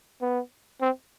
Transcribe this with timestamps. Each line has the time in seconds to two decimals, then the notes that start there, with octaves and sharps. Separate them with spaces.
0.21 B3
0.81 C4